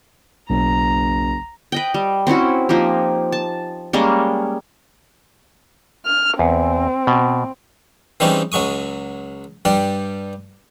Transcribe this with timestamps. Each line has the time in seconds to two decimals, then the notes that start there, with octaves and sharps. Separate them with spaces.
0.50 F#1 B1 A#5
1.72 B4 D#5 G5
1.94 G3
2.27 C4 C#4 E4 F#4
2.69 F3 A#3 D#4 G4
3.32 A5
3.93 G3 G#3 A#3 C#4
6.06 F6
6.39 E2 C4
7.07 B2
8.20 E3 G3 G#3 C4 C#4 D#4
8.52 C#2 F#3 G#3 C#6 D#6
9.65 G2 G3 D5 G5